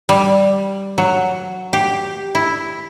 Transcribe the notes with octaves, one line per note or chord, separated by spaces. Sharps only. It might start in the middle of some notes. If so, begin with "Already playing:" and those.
G3
F#3
G4
E4